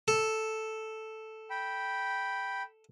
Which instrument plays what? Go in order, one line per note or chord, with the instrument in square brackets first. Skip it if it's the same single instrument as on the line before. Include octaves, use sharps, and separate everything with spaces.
[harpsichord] A4
[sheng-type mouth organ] G5 B5